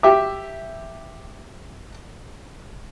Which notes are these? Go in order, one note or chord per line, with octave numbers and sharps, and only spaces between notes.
G4 E5 D6